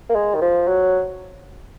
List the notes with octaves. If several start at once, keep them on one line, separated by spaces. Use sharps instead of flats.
A#3
G#3
D#3
F3
F#3